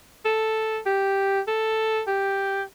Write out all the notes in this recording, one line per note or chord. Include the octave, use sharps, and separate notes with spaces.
A4
G4
A4
G4